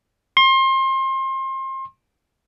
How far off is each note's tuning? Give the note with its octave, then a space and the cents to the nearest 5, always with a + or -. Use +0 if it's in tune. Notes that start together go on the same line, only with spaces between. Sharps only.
C6 +30